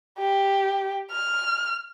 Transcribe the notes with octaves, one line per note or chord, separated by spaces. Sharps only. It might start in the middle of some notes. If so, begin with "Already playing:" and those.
G4
F6